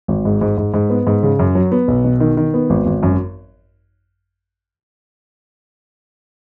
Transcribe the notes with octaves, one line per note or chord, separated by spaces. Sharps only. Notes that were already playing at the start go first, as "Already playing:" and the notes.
G#1
G#2
G#2
G#2
G#2
B3
G#2
C#3
F#2
F#3
B3
B1
B2
D#3
D#3
B3
G#1
G#1
F#2